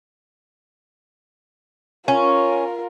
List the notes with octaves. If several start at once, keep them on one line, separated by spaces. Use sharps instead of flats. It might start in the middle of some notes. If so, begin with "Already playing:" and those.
C#4 F4 A#4